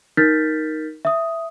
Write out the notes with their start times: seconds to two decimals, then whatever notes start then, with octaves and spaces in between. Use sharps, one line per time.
0.17 D#4 A#4 F6 G6 A6 B6
1.05 E5 D#6